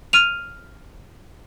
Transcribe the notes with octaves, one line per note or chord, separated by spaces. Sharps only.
F6 D#7 F7